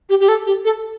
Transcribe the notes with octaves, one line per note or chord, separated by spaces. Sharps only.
G4
G4
A4
G4
A4